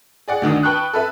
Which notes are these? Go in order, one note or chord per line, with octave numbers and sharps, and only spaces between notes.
G#4 D5 F#5
D2 D#3 D4 D#6
B4 G5 A5 C#6 F#6
A4 B4 E5